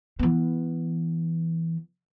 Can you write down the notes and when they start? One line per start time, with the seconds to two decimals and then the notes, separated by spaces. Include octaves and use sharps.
0.19 E3 B3